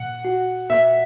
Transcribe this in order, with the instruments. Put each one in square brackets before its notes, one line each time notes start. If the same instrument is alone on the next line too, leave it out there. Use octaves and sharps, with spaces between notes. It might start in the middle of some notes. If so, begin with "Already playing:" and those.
Already playing: [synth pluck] A#2 [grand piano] F#5
[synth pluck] F#4
[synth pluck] A#2 [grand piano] E5